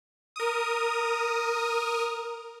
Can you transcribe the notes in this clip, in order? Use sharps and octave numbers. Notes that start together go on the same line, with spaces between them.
A#4 D#6